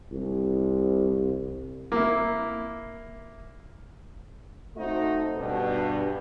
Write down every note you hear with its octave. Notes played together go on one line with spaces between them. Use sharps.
C2
A#3 E4
A3 C4 D#4 F#4 A4 D#5
G2 B2